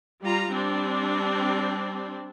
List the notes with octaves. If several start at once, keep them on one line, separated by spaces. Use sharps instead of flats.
G3 F4 A#5
G3 C4 D4